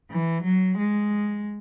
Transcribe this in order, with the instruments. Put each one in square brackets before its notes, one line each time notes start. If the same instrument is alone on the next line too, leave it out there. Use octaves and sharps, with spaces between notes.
[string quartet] E3
F#3
G#3